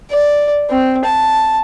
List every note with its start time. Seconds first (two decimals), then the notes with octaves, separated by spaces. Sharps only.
0.11 D5
0.70 C4
1.04 A5